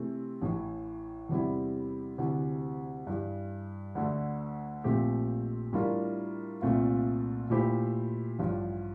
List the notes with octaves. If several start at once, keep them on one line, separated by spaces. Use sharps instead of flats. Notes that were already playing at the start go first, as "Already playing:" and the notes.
Already playing: C3 E3 A3 C4
A1 A2 E3
E2 C3 G3 C4 E4
D2 C3 E3
G2 E3 G3
D2 D3 A3
A#1 A#2 A3 C4 G4
A2 G3 D4 F4 A#4
C2 A#2 A3 C4 F4
A#2 A3 E4 G4 C5
A1 G2 F3